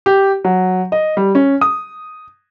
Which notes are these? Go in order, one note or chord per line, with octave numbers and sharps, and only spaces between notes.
G4
F#3
D#5
G3
C#4
D#6